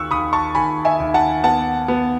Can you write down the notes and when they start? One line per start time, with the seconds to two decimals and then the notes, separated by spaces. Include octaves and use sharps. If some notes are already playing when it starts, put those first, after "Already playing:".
Already playing: D#2 C#6 E6 F#6
0.11 D#2 B5 D#6
0.33 A5 C#6
0.55 D#2 G#5 B5
0.85 E5 G#5
1.00 D#2
1.14 F#5 A5
1.43 B3 F#5 A5
1.88 B3